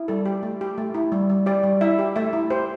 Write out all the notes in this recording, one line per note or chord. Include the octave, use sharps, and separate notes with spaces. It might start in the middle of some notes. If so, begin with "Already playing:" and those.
Already playing: E4
G3 A4
G4
A3
G4
A3
E4
G3
G3
G4 D5
G3
E4 E5
G4
A3 E5
E4
G4 C5